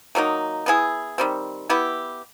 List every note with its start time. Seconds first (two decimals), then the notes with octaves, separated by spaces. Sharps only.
0.15 D#3 F#3 A#3 D#4
0.66 B3 E4 G#4
1.18 D#3 G3 C4
1.69 B3 E4 G4